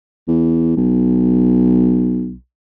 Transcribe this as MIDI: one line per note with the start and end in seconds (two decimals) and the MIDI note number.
0.28 0.74 40
0.76 2.34 35